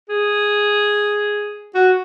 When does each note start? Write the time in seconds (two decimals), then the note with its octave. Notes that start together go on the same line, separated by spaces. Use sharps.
0.09 G#4
1.74 F#4